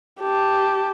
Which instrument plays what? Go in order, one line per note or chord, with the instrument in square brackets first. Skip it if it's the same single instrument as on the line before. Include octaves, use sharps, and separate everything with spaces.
[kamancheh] G4 A5